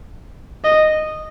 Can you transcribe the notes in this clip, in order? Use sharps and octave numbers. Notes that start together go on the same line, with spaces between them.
D#5